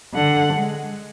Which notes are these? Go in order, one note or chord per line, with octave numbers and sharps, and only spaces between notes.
D3 F#5
G#3